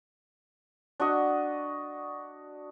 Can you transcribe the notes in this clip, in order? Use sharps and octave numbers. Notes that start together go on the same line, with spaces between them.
D4 F#4 D#5